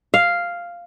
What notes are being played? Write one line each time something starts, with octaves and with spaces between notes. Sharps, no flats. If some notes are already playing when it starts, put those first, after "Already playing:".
F5